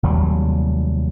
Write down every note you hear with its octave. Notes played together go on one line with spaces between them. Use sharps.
F1 D#2 F#3 G3